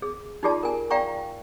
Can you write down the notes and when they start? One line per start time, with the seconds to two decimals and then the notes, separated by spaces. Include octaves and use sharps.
0.02 G#4
0.43 D#4 F4 G4 G#4 D5 A5
0.63 A#4 G#5
0.90 D5 F5 G5 A#5 C#6